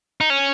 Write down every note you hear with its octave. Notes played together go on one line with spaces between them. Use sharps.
D#4
C#4